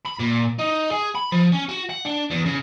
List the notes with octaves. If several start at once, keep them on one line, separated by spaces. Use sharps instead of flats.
B5
A#2
D#4
G#4
B5
F3
C#4
F#4
F#5
D4
E2
C#3